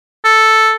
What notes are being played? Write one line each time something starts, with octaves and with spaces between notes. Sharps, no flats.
A4